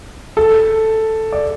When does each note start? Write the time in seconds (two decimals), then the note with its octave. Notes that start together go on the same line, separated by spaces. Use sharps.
0.37 A4
1.33 D5